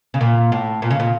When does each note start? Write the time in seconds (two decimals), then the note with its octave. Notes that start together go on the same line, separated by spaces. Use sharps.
0.14 C#3
0.21 A#2
0.52 A2
0.82 A#2
0.91 C#3
1.00 A#2